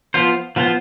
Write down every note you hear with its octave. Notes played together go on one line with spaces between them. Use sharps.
F3 B3 F4 C5
F3 B3 F4 C5